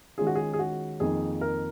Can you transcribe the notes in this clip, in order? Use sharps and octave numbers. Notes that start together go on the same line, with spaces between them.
D#3 G#3 C#4 F4 G#4
F#4
G#4
G#4
F#4
F2 D#3 A#3 D#4 G#4
A#4